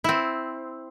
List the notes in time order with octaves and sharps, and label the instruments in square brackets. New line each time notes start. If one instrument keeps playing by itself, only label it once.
[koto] C4 E4